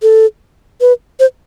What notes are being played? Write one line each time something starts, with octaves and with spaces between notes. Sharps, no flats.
A4
B4
C5